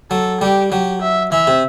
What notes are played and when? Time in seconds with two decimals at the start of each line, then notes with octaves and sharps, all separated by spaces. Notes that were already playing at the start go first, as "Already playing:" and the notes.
0.11 F#3 A4
0.41 G3 G4
0.72 F#3 G4
1.02 E5
1.32 E3 E5
1.47 C3